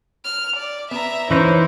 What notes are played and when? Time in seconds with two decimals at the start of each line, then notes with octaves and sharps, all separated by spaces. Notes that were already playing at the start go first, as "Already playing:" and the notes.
0.24 F6
0.56 D5
0.91 B3 E5 A#5
1.31 E3 C#4 D#4 E4 C5 C#5